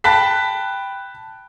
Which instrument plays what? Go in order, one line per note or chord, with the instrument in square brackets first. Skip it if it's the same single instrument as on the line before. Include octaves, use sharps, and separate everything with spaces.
[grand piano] G5 A5 B5 F#6 B6